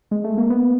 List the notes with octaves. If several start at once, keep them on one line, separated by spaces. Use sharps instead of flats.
G#3
A3
A#3
B3